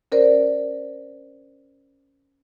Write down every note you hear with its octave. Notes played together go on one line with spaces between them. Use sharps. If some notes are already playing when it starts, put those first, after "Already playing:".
C#4 A#4 C5 D5